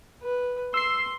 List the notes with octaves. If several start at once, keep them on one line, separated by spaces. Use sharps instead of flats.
B4
C6 E6 C7